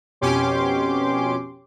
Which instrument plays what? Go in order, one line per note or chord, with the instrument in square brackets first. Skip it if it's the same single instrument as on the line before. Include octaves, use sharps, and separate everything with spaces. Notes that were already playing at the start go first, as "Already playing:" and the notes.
[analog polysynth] F2 B2 C#4 G4 C6 D6